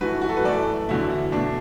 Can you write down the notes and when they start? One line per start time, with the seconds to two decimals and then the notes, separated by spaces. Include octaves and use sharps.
0.01 F#2 E3 A3 F#4 B4
0.22 F#4
0.29 A4
0.37 B4
0.44 F#2 E3 A3 A4 D5
0.89 E2 D3 F#3 A3 E4
1.10 E4
1.32 B2 A3 D4